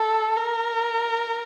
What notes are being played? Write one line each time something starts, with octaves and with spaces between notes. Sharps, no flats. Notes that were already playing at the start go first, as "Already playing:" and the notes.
Already playing: A4
A#4